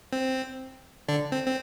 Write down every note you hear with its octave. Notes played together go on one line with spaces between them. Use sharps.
C4
D3 D4
C4
C4